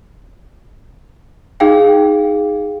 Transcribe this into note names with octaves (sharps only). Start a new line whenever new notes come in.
D#4 G#4 F5 G5